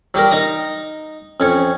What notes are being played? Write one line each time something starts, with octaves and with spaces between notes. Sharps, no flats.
F#3 G3 G4 A#4
D#4 A#5 D#6
F2 C#4 C#5